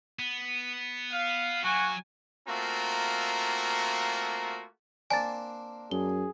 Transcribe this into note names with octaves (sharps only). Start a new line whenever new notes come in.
B3
F5
F#3 A#3 F#4 G#5
A3 A#3 C4 F4 F#4 A#5
A#3 C4 D4 G#5 A6
F#2 G#4 G7